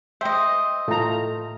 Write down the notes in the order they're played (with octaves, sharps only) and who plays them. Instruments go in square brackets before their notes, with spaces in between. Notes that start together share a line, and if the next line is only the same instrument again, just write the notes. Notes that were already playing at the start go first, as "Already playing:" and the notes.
[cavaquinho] C5 D#5 [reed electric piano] E5 G5
[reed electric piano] A2 A3 [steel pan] F4 A#5